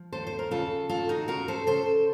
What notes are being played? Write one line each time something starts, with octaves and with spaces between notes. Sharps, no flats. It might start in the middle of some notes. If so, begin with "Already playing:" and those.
Already playing: F3
D#2 A4 C5
C5
A#4
C#3 F4 A4
D#2 F4 A4
D#4 F#4
C#3 F#4 A#4
A4 C5
C#3 A4 C5